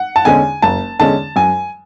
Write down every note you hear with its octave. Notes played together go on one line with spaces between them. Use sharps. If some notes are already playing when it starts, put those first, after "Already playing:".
Already playing: F#5
A5
E2 D3 G#3 C#4 G#5
F#1 A5
E2 D3 G#3 C#4 A5
F#2 G#5